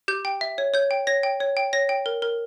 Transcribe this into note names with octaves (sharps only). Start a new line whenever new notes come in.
G4 G6
G5
E5
C#5
C#5 G6
G5
C#5 A#6
G5
C#5
G5
C#5 A#6
G5
A#4
A#4